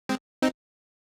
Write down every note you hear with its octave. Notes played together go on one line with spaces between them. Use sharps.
G#3 C4
C4 D#4